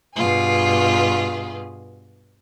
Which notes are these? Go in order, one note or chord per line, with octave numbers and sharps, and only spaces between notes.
G2 B2 F4 G#4